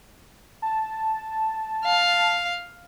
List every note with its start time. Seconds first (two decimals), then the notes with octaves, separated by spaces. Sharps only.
0.62 A5
1.85 F5